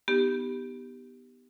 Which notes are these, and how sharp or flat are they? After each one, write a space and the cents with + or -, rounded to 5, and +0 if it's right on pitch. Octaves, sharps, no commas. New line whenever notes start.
B3 +0 D#4 -20 G4 +0